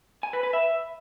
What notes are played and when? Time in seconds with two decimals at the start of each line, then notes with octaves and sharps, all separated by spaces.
0.23 G#5
0.33 B4
0.43 B4
0.53 E5